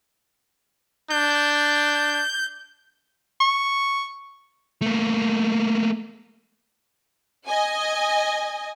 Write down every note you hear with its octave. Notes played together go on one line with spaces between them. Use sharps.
D4 G6
C#6
A3 A#3
D#5 G#5